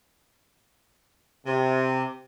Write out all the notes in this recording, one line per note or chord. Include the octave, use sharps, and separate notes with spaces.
C3